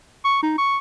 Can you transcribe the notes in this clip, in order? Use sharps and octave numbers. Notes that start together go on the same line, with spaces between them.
C#6
D#4
C#6